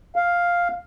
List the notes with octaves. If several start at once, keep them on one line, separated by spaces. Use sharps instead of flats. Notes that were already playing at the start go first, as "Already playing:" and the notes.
F5